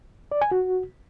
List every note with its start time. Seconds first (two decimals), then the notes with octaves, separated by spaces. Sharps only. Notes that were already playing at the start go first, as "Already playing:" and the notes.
0.32 D5
0.41 G#5
0.51 F#4